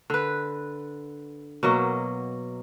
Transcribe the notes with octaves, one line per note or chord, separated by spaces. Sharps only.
D3 B4
B2 F#3 A#3 D#5